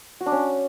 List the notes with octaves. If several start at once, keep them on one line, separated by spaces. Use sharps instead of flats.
F#4
D4
C#4